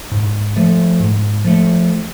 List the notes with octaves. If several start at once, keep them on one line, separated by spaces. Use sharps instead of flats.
G#2
F3 A3
G#2
F3 A3